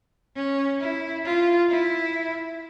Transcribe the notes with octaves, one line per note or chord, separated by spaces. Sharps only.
C#4
E4
F4
E4